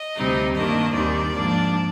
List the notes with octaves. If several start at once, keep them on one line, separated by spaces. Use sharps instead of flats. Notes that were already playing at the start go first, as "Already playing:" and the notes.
Already playing: D#5
D2 C3 G3 C4 D#4
G2 D#3 A#3 D4 D#5
D#2 D#3 G3 C4 D5
G#2 F3 A#3 D4